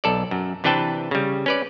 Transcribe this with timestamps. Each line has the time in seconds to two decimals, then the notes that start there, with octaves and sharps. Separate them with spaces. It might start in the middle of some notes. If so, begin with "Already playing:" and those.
0.04 B1 A4 D5
0.31 F#2
0.64 C3 E3 D4 B4 G5 A5
1.11 C#3 G3
1.46 C#4 B4 D5